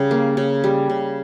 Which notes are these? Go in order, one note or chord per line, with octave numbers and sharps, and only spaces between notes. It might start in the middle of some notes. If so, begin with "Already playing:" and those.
Already playing: C#3 G3 G4
A#3
C#3
G3
C#3